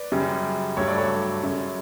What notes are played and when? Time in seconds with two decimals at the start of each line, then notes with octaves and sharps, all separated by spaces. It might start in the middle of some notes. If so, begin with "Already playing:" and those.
Already playing: B4 D5
0.12 F#2 C#3 G3
0.77 G2 F#3 A3 C#5
0.88 D5
0.98 A4 C#5
1.43 F#2 C#3 F#3